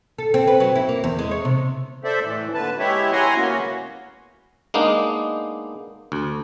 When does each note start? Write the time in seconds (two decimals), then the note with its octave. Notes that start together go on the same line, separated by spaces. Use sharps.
0.18 A4
0.34 C4
0.47 B4
0.60 F#3
0.76 E4
0.89 A#3
1.04 E2
1.19 G#3
1.31 C#5
1.45 C3
2.04 A4 C5 D5 E5
2.23 A2 E3
2.54 A#2 D3 B4 A5
2.79 G#3 B3 E4 G4 C#5 E5
3.12 E4 C#5 F#5 G#5 A#5 C6
3.35 C#3 A#3 B3 C#4 F#4
4.74 G#3 A#3 B3 D4 D#4
6.12 D2